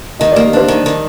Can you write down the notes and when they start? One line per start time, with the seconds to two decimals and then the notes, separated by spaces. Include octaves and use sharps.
0.20 D#3 D#5
0.32 A#3 D5
0.45 A#4
0.53 D4 C5
0.68 D#3
0.86 D#3